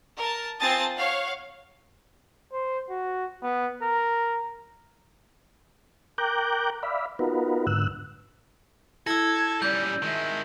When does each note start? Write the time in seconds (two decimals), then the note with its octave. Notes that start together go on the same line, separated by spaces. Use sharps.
0.17 A#4 A5
0.60 C4 F4 G#5 A5 D#6 A6
0.94 C#5 F5 F#5
2.52 C5
2.90 F#4
3.43 B3
3.82 A#4
6.18 A#4 G5 A#5 D6 F#6 G6
6.83 D5 E5 F5 B5
7.19 B3 D#4 F4 F#4 A#4 B4
7.67 G#2 D3 E6 F#6
9.07 E4 A4 E6 G#6 A#6
9.62 G3 C#4 D5 G6
10.03 D#3 G#3 E5